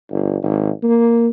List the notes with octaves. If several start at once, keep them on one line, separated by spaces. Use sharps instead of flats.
G1
G#1
A#3